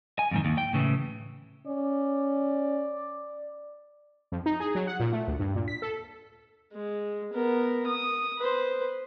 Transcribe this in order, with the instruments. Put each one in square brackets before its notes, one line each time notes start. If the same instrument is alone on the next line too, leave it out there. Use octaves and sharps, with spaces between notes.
[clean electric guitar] G#5
F2 G#2 D#3
D#2
G5
A2 C#3 E3
[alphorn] C#4 [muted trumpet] D5
[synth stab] F2
D#4
G#4
F#3
F#5
A#2
A3
D2
G2
A#2
B6
A4
[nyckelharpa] G#3
B3 A#4
D#6
B4 C5